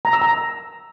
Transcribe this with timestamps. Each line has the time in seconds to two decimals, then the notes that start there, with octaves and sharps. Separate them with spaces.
0.05 A#5
0.13 E6
0.22 A#5